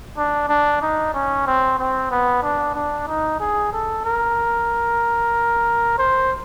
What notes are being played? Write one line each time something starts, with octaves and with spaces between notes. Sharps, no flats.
D4
D4
D#4
C#4
C4
C4
B3
D4
D4
D#4
G#4
A4
A#4
C5